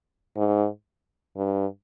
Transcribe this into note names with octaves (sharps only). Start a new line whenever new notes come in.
G#2
G2